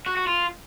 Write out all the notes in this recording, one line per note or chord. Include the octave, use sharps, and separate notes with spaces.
F#4
F#4
F4